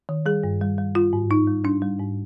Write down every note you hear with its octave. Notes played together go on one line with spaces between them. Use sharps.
D#3
G3 G#4
G2
G3
G3
G3 F4
G#2
G#2 D#4
G3
G3 D4
G3
G#2